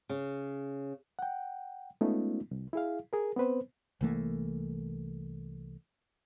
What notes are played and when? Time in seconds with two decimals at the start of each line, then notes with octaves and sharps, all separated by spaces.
0.09 C#3
1.19 F#5 G5
2.01 G#3 A3 B3 C#4 D#4 F4
2.51 C2
2.73 E4 G#4 F5
3.13 G#4 A#4
3.37 B3 C4 B4 C5
4.01 C2 E3 A3 A#3